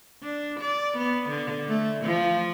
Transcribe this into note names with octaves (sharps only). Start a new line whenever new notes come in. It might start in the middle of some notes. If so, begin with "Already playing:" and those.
D4
D5
B3
D3
A3
F3